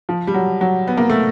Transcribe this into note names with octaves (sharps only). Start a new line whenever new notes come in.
F3
G3
F#3
F#3
B3
A#3
A3